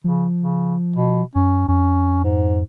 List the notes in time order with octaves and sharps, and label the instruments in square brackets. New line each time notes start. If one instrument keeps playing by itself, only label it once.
[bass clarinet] C#3 [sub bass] F3
[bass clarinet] C#3
B2
[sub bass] F#2 [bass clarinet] C#4
[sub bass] F2 [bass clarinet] C#4
[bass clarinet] G#2